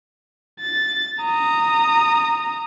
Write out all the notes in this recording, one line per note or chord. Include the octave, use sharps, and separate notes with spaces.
A6
A#5 D#6